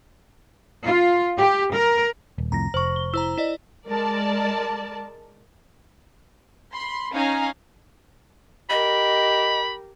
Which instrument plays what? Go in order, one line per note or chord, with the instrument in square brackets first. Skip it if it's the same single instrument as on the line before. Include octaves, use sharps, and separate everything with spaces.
[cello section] F4
G4
A#4
[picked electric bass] D#1
[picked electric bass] C2 F2 A2 [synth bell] A#5 A#6
[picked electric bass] F1 [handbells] C5 C#6
[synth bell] G7
[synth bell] E4 C5 A#5 [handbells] E6
[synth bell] E4 D5 D#5
[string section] G#3 A#4 D5 A5
[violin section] B5 C6
C#4 D#4 F5 G#5 A#5
[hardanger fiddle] G4 A#4 [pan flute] D#5 [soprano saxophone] B5